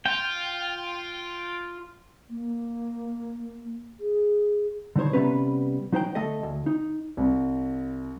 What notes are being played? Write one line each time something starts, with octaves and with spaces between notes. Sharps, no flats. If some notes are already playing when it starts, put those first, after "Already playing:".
F4 G5
A#3
G#4
D3 G3 D#4 C5 C#5
C3 G3 B3 C#4 B4
F#3 D#4 C5 F#5 G5
D3 A3 A4 D#5
D2
D#4
C2